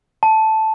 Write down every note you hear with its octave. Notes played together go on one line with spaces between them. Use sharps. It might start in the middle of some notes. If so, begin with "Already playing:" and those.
A5